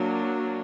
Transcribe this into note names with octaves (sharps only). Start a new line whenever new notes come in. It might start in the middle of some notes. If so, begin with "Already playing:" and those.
Already playing: F#3 A#3 D4